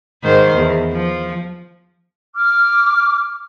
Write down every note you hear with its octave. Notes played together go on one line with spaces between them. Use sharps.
G#2 D#3 C5
E2
F3
D6 F6